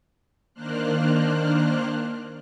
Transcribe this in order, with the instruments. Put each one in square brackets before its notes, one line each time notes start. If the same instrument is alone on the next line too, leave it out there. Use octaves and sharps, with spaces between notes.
[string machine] D#3 A#3 D4 C5 F6 F#6